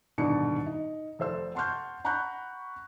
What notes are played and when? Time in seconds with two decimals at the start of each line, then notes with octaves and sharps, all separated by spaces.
0.18 D#1 G#2 B2 D3 D5 C#7
0.66 D#4
1.19 F1 A4 C5 E6
1.55 F#5 A5 C6 C#6 F6 G6
2.05 F#5 A#5 B5 C#6 F#6 G6